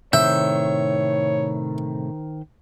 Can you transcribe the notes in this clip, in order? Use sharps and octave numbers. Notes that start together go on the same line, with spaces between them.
A2 C3 D#3 C5 C#5 E5 G6